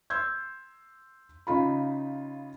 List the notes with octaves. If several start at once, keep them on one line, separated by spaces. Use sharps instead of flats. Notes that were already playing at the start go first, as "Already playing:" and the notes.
C6 E6 G6 G#6
C#3 D#4 F4 B5